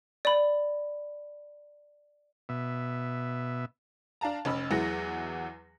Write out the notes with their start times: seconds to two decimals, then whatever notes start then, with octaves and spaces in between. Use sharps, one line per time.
0.25 D5 B5
2.49 B2 E5
4.21 D4 F5 A5 A#5
4.45 F1 C#4 D#5 B5 E6
4.71 E2 E3 F#3 G#3 F#5 A#6